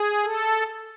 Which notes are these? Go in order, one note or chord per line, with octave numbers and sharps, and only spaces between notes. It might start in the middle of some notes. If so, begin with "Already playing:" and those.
Already playing: G#4
A4